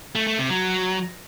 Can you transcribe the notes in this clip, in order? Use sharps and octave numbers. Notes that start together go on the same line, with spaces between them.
A3
A3
C3
F#3